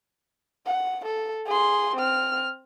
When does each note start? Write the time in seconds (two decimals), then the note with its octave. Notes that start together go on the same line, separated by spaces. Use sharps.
0.66 F#5
1.06 A4
1.47 G#4 C6
1.97 C4 F6